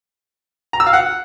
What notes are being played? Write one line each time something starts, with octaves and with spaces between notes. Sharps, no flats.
A#5
E6
F5
F#5